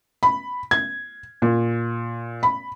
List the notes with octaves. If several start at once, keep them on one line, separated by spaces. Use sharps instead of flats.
B5
G#6
A#2
B5